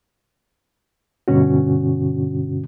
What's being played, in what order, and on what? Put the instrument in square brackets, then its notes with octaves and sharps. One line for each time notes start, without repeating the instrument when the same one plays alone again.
[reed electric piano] G2 B2 D3 C#4 F#4